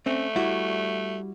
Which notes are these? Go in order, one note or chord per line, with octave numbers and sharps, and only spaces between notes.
A3 C4 C#4
G3 E4 F#4